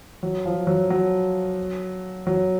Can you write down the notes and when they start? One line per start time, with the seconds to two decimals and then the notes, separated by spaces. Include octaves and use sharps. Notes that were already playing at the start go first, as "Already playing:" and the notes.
0.23 F#3
0.46 F3
0.67 F#3
0.90 F#3
2.27 F#3